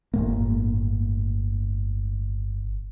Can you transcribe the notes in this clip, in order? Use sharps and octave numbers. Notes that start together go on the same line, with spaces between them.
G1 A2 A#3